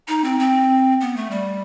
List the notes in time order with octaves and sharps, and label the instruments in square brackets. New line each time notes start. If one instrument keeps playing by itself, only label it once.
[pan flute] D#4
C4
C4
B3
A3
G3